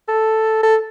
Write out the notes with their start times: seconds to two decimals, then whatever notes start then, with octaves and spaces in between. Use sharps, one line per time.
0.08 A4
0.63 A4